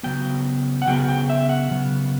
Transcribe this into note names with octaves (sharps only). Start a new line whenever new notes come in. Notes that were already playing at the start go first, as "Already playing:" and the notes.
C#3 F#3 B3 G5
F#5
C#3 F#3 B3 G5
G5
E5
F#5
C#3 F#3 B3